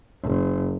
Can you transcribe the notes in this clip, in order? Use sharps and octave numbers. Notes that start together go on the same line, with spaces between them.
F#1